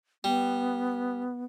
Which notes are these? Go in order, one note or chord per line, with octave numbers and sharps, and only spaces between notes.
G3 B3